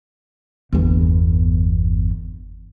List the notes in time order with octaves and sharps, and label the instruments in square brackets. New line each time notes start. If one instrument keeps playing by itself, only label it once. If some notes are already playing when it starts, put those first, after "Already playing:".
[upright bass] G1 E2